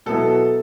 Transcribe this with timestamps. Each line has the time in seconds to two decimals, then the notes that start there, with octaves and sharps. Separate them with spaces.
0.06 B2 F#3 B3 E4 A4